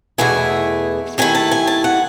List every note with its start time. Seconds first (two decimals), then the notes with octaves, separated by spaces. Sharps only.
0.18 E2 B2 A3 E4 G#5
1.18 D#2 D#3 A3 E4 G#5
1.35 A5
1.51 G#5
1.67 A5
1.84 F#5